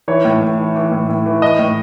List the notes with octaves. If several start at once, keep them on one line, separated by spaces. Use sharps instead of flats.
E3 C#5
A2
A2
E3
E3
A2
A2
E3
E3 D#5
A2